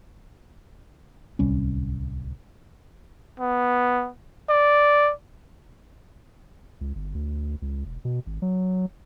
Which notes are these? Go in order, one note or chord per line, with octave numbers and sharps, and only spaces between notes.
D1 C2 G3 C#4
B3
D5
C#2
G1
D2
C#2
E1
B2
G#1
F#3